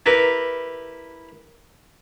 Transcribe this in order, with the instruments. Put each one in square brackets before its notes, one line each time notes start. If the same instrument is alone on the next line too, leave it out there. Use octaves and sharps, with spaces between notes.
[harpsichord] E4 G4 A#4 B4